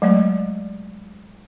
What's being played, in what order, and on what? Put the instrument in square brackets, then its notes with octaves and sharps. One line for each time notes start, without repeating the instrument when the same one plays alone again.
[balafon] F#3 G#3 A3 D5